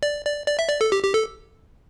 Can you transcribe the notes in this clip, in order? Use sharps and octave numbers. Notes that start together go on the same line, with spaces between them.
D5
D5
D5
E5
D5
A4
G4
G4
A4